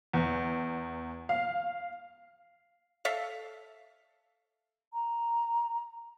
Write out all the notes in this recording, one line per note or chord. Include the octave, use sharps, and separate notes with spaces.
E2
F5
A4 E5 F5
A#5